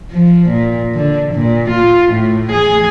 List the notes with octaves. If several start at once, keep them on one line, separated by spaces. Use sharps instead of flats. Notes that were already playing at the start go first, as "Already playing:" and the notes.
F3
A#2
D3
A#2
F4
A2
G#4